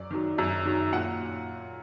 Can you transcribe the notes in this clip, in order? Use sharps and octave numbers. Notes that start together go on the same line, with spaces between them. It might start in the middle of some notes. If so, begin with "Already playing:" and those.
Already playing: F#2 D5
D#3 F#3
F#2
D#3 F#3
A#2 F#5